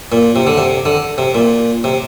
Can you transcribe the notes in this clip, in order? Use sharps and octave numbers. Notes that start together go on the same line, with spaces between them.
A#2
C3
D3
C3
D3
C3
A#2
C3